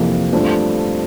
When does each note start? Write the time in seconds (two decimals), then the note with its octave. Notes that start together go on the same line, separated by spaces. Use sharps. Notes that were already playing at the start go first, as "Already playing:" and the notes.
Already playing: F2 C3 E3 A#3
0.33 G2 F3 A3 C4